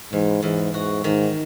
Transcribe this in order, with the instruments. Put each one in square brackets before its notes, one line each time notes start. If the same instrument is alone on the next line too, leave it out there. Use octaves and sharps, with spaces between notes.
[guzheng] E2 [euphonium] G#2
[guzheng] E2 [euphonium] G#2
[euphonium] G#2 [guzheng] F#4
[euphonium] G#2 [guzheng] D#3